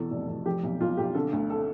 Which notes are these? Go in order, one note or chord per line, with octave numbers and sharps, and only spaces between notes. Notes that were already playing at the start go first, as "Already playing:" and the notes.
Already playing: E2 B2 A4
F1
F1
F3 G4
B1
B1 F4
B1 G4
D3 A4
D2
A4